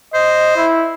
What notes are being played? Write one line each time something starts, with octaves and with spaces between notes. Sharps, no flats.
C5 D#5
E4